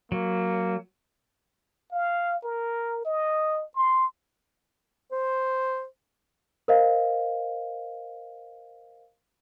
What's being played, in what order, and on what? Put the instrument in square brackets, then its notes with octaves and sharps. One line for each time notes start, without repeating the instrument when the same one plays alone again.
[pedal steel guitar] F#3 [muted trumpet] A#3
[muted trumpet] F5
A#4
D#5
C6
[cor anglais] C5
[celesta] A#4 C5 D#5 F5